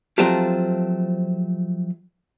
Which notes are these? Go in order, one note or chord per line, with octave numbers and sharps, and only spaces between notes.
F3 F#3 A3 C4 F4 G4